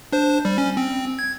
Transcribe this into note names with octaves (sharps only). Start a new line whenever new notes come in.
D4 C5
G3
C#4
C4
G#6